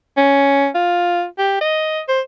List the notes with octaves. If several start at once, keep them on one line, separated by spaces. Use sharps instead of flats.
C#4
F4
G4
D#5
C5